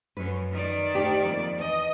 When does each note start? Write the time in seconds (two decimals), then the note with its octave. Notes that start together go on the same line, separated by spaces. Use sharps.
0.17 F#2 B4
0.52 D#3 D5
0.94 D2 G4
1.24 F2 A#3
1.59 E2 D#5